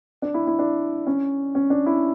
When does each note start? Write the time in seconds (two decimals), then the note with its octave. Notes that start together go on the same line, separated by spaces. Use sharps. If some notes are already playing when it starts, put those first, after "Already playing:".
0.22 D4
0.34 E4
0.47 E4
0.59 D4
1.07 C#4
1.55 C#4
1.70 D4
1.86 E4